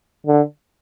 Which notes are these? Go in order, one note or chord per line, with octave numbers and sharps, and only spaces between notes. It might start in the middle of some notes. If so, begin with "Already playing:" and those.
D3